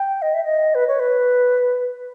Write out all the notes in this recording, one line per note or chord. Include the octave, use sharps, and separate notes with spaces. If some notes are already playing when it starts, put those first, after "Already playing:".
Already playing: G5
D#5
E5
D#5
B4
C#5
B4